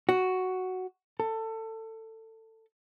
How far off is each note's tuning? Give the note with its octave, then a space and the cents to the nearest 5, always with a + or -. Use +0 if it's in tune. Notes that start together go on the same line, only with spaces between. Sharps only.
F#4 +5
A4 +20